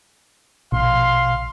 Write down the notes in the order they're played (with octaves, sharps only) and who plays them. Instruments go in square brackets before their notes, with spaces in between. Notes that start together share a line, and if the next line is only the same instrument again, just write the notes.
[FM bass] A#1 [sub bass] B2 [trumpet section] F5 C6